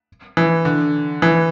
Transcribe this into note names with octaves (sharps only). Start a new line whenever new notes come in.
E3
D3
E3